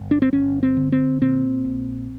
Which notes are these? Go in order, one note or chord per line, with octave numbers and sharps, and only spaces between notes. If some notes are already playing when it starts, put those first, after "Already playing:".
Already playing: G1
D4
C4
G1 C#4
C4
D3
C4
A#2 C4
A#1